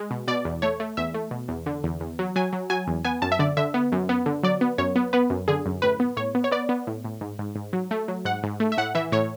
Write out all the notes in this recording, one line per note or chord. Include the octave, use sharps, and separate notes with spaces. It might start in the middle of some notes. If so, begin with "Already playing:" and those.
Already playing: G#3
B2
B2 D5
E2
A3 C#5
A3
E2 E5
A3
B2
E2
D3
E2
E2
F#3
F#3 G#5
F#3
F#3 G#5
E2
B3 G#5
F#2 A5
E5
D3 D5
D3 E5
B3
F#2
B3
D3
F#3 D5
B3
F#2 C#5
B3
B3 B4
F#2
D3 G#4
F#2
A2 B4
B3
A2 C#5
B3
C#5
B3 D5
B3
A2
A2
G#2
G#2
G#2
F#3
A3
F#3
G#2 F#5
G#2
A3
E5
A2 F#5
E3 E5
A2 C#5